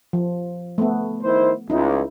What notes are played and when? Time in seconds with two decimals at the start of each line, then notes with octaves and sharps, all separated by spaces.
0.13 F3
0.78 A3 B3
1.23 D#3 E4 C5
1.70 C#2 D#4 E4